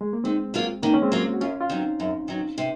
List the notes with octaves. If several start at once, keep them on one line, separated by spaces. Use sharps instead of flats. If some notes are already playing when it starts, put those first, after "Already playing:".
G#3
A#3
D#3 G#3 C4
F#3 A#3 F4
D#3 A#3 C#4
C#4
G#3 C4
F#3 A#3 F4
F#4
F#2 C#4 F4
F4
D#3 F#3 C4 D#4
F#2
D#3 F#3
C3